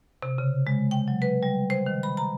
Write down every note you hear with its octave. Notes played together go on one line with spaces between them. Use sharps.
C3
C#3
G#3
G5
F#3
B4
G3
C5
D#3
B5
A#5